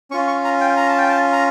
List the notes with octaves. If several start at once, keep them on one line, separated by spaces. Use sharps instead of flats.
C#4 F4 C#6
C#6
A#5
G5
A#5
A5
G5
A5
A#5